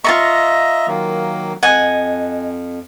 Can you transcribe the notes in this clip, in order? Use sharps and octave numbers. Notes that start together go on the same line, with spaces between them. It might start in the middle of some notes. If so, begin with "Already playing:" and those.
F4 A4 D#5 E5 A#5 C#6
D#3 F#3 A#3
F2 D#5 F#5 G#5